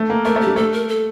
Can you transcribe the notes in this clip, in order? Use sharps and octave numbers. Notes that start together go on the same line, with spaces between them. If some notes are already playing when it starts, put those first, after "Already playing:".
Already playing: A3
A#3
A3 A#4
A3
G4
G3
A3 A4
A#4
A4